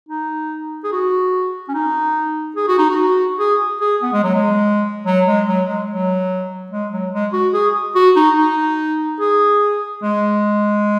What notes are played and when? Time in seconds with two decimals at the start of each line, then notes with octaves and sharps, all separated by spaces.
0.09 D#4
0.84 G#4
0.92 F#4
1.69 C#4
1.75 D#4
2.57 G#4
2.68 F#4
2.79 D#4
2.90 F#4
3.40 G#4
3.81 G#4
4.03 B3
4.13 G#3
4.24 F#3
4.35 G#3
5.06 F#3
5.27 G#3
5.47 F#3
5.67 G#3
5.88 F#3
6.72 G#3
6.92 F#3
7.13 G#3
7.33 F#4
7.54 G#4
7.95 F#4
8.16 D#4
8.37 D#4
9.20 G#4
10.03 G#3